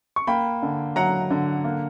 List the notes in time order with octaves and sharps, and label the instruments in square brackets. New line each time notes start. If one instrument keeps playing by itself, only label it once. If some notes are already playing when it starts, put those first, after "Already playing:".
[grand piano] C#6
A#3 G5 B5
D3
F#3 F#5 A#5
D3
A#3